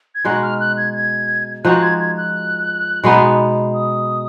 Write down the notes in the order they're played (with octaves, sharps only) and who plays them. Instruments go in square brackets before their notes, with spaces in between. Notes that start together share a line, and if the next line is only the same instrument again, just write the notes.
[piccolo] G#6
[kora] B2 G#3 D#4 F#4 [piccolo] F#6
[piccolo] F6
F#6
G#6
G#6
[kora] F3 G#3 D#4 F#4 [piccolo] F#6
[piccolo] G#6
G#6
F#6
[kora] B2 G#3 B3 D#4
[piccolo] D#6